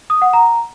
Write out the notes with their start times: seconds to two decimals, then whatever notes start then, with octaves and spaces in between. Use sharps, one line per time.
0.10 D#6
0.22 F#5
0.33 A#5